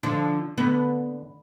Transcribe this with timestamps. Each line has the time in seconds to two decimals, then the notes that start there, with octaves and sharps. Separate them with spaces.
0.03 D3 F3 D4
0.58 D3 B3